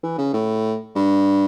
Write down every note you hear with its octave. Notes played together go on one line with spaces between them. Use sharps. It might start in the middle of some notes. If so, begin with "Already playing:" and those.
E3
C#3
A2
G2